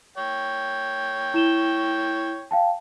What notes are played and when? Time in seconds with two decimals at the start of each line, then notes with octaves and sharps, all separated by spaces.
0.18 C#5 G5
1.34 E4 E7 G7
2.51 F5 G5 A5